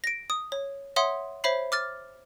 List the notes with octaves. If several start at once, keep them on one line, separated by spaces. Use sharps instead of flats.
A#6 D7
D#6
C#5
C#5 E5 F#5 C6 D#6
C5 C#5 E5 B5 C7
D6 F6 A6